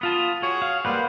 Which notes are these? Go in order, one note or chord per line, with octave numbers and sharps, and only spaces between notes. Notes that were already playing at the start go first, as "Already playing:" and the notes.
B3 F4 A5 D#6
F#4 G#4 C#5
F5
G3 A#3 B4 C5 F#5